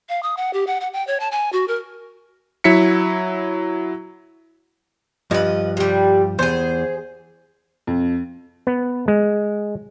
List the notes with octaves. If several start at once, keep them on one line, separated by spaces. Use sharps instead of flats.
F5
D#6
F#5
G4
F#5
F#5
G5
C#5
A5
G#5
F#4
A#4
F#3 E4 B6 C#7
G2 F3 B4 D#5
C3 G3
E2 G#4 C5
F2
B3
G#3